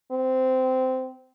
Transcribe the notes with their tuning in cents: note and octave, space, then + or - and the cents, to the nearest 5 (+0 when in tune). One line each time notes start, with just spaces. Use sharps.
C4 -15